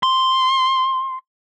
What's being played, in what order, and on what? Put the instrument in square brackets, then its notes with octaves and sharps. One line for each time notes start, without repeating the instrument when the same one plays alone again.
[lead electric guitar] C6